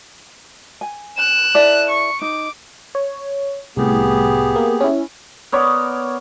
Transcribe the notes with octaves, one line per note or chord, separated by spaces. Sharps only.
G#5
F#6 E7
E4 A4 D5
C#6
D#4 D6
C#5
C2 A2 B3 G4 G#4
A#3
C#4 E4
B3 A#4 C#5 D5